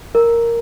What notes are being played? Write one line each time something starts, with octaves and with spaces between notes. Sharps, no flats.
A#4